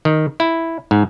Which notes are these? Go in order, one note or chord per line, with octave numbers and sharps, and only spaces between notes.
D#3
E4
G#2